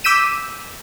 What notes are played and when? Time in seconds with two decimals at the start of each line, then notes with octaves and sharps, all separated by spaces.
0.04 D6 E6 G6 B6 D#7 E7